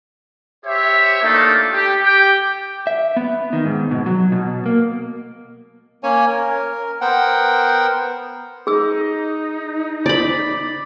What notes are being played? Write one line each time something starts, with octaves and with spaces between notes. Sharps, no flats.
G4 C5 C#5 E5
A3 A#3 D4 D#4 F4 A4
G4
G4 G5
E5
B3
D#3
G#2
B2
F#3
B2
A#3
A#3 C#4 C#5 G#5
A#4
B3 A#4 C5 F#5 G5
D#4 G#4 E6
D5 B5 D6